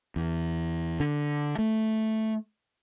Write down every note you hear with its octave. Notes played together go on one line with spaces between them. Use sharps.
E2
D3
A3